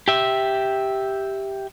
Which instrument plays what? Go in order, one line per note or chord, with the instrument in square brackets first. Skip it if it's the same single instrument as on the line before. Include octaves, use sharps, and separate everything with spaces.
[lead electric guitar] G4 E5